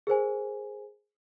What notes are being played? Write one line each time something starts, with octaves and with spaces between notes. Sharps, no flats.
G#4 A#4 C5 G#5